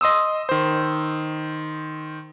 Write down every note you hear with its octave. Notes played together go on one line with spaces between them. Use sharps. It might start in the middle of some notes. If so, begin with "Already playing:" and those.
D#5 C6 D#6 E6
D#3 C5